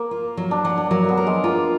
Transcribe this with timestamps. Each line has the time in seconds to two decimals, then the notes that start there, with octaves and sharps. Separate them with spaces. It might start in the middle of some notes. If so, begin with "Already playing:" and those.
Already playing: A#3
0.11 F4
0.37 F#3
0.51 D4
0.65 F#3 D4
0.77 D4
0.91 F#3 A#3
1.04 A#3 B3
1.17 A#4
1.27 G#3
1.44 A#3 F4